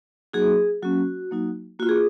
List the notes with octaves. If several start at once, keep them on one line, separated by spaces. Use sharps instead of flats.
F#3 A#3 D#4 F#4 G#4
F#3 A#3 C#4 F#4
F#3 A#3 D#4 F#4
A#3 F4 F#4
G#4